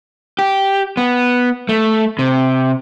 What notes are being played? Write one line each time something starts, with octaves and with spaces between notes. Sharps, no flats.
G4
B3
A3
C3